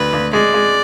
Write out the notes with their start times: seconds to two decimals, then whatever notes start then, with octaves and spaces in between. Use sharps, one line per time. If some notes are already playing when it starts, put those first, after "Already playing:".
Already playing: D2 B4
0.13 D2
0.33 G#3 D5
0.54 G#3